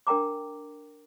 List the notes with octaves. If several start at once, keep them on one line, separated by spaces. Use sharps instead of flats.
D4 A#4 G5 A#5 D6